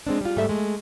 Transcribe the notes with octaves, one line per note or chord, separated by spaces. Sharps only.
G#3 C4 D4
G3 F4
G#2 G3 A3 A4 E5
G#3 A3